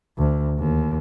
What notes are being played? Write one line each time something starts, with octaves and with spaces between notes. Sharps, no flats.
D2
D#2